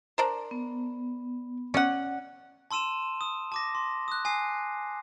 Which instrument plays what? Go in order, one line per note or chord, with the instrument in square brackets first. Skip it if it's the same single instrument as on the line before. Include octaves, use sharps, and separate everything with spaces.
[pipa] D4 A#4 C5
[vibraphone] B3
[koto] C#4 [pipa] D5 F#5
[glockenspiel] A5 C6 E6 D#7 E7
D#6
A5 D6 A#6
C6
D#6 F#6
G#5 D#6 C7